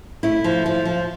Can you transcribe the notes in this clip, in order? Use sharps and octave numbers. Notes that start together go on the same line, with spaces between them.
A3 E4
F3
F3
F3